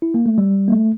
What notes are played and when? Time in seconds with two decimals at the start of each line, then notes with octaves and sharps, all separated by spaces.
0.02 E4
0.14 A#3
0.26 A3
0.38 G3
0.68 A#3
0.72 A3